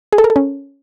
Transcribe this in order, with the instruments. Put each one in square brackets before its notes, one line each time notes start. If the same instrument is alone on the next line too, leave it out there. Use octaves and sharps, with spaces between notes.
[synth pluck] G#4
A4
A#4
A4
C#4